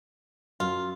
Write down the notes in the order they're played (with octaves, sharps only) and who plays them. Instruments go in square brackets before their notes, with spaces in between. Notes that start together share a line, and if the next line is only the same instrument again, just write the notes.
[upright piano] F#2 [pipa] F4